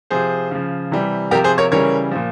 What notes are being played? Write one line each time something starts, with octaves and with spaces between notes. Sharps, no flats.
C3 F3 G#4 C5
C#3 F3
C3 E3 G3
C3 F3 G4 A#4
G#4 C5
A#4 C#5
C#3 E3 G3 A#4 C#5
A#2 F3